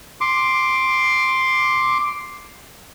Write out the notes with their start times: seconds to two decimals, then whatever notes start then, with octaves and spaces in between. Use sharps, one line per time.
0.21 C6 D6